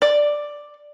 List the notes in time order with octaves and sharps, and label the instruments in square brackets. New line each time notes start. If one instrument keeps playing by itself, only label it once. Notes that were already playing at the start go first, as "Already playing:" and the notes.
[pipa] D5